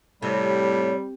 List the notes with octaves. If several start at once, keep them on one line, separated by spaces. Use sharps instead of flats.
A2 C3 G3 C#5